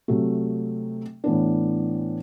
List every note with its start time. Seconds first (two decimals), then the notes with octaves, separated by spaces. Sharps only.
0.08 C3 F#3 A3
1.24 A2 E3 B3 D4